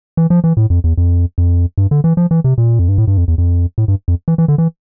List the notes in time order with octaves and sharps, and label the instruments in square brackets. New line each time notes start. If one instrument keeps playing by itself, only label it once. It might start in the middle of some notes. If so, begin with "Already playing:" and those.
[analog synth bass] E3
F3
E3
A2
F2
E2
F2
F2
G2
D3
E3
F3
E3
C3
A#2
F2
G2
A2
G2
F2
E2
F2
A2
G2
F2
E3
E3
D3
E3